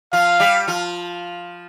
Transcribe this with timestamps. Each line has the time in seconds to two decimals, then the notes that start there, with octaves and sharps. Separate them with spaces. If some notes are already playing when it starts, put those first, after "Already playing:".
0.13 F3 F4 F5
0.40 G3 G4
0.67 F3 F4